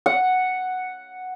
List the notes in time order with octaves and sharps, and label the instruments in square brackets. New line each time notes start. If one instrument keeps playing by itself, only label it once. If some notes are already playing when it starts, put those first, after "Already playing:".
[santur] F#5